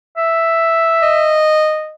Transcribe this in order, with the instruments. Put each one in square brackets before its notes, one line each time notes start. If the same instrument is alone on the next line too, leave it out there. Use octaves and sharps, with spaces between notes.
[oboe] E5
[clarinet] D#5